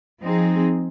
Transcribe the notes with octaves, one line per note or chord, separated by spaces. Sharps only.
F3 C4 D#4 G#4